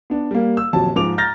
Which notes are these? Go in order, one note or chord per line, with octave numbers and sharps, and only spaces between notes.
B3 D4
G3 A#3
E6
D#1 F2 F#3 A5
G#2 F3 D#4 G#4 D6 F7
A#5 F6 G6 A6 A#6